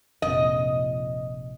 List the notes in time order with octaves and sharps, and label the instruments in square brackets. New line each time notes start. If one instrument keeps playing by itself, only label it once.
[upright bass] F1 A#1 [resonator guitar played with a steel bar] D#5